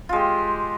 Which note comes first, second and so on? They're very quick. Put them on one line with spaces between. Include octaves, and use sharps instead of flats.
F4 G#3 G4